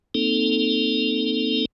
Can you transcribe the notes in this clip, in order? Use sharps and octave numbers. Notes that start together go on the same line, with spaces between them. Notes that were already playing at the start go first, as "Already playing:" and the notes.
A#3 C4 D#4 A4